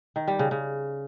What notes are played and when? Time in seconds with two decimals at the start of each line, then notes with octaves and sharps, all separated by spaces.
0.16 D#3
0.28 G3
0.39 C#3
0.51 C#3